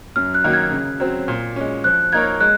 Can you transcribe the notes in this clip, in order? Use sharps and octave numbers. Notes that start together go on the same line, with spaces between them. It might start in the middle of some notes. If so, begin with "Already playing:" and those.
F#2 F6
F#6
D#3 F#3 A#3 D#4
G#6
C#3
F#3 C4
A#2
G#3 C#4
F3 F#6
A#3 D#4 A#4 C#5 G#6
G#3 F#6